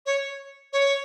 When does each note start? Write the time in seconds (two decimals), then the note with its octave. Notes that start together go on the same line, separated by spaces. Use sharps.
0.06 C#5
0.73 C#5